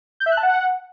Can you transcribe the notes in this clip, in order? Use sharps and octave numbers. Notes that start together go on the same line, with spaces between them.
G6
E5
F#6
A5
F#5